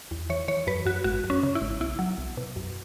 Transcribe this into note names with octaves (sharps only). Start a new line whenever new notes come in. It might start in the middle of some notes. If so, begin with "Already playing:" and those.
E2
E3 C#5
E3 C#5
F#2 B4
F#2 F#4
G#1 F#4
F#2
C#4
C#3
E4
G#1
B1 E4
F#3
B1
B2
F#2